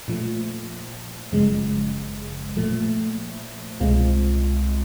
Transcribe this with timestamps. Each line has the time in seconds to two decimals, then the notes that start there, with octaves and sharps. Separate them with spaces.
0.08 A#2 F3 A3
1.32 G1 F#2 C#3 F3 G#3
2.57 A#2 F3 A3
3.80 C2 B2 G#3 C4 F4